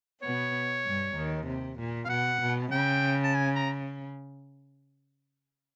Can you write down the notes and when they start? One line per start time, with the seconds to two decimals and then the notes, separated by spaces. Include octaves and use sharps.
0.23 B2 B3 C#5
0.85 G2 G3
1.16 D#2 D#3
1.47 C3
1.79 A#2
2.05 F5
2.09 B2 F#5
2.41 B2
2.72 C#3 G5
3.24 A5
3.35 G#5
3.55 A#5